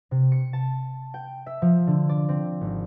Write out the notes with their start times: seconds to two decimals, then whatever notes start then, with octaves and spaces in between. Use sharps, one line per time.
0.11 C3
0.32 C#7
0.53 A5
1.14 G5
1.46 E5
1.62 F3
1.87 D3
2.09 D5
2.29 C4
2.61 G#1